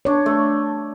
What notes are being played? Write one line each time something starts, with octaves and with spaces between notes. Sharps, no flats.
D4 C#5
A3